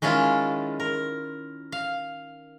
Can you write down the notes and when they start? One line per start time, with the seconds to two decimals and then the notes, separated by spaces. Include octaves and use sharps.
0.02 D#3 G#3 C#4 E4 F4
0.80 A#4
1.72 F5